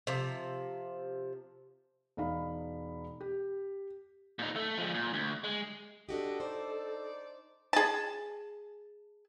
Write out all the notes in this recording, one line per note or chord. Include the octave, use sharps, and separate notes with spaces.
C3 F3
E1 D#4 F5 B5
G4
A#2 D#4
A3
F3 G#3
A#2
D2
G#3
D4 F#4 G4 A4 D#5
D#4 C5 D5
G#4 A5